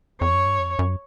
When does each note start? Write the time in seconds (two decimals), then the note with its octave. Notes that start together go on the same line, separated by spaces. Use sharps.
0.21 F2 C#5
0.34 F#2
0.46 G2
0.59 F2
0.79 F#2